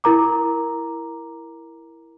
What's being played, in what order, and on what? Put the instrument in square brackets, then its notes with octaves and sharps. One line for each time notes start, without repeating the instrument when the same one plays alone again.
[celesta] E4 A#4 A#5 D6